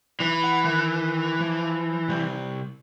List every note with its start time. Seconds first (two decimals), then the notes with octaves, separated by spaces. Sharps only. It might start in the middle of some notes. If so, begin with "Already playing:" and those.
0.20 E3
0.44 F#5
0.64 D#3
1.40 F3
2.08 C3 G3